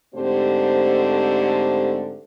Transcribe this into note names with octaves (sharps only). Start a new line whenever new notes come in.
G#2 D3 A3 C4 G4 C5